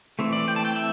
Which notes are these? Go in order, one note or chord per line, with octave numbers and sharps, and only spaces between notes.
E3 A3 C4
D5
G5
A5
G5
E5